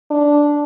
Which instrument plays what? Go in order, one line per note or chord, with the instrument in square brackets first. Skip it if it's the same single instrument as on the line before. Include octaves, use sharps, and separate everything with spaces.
[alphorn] D4